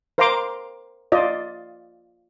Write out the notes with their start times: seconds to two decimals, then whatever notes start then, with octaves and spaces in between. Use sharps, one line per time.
0.18 A#4 C5 F5 A#5 C6 D6
1.12 F4 D5 D#5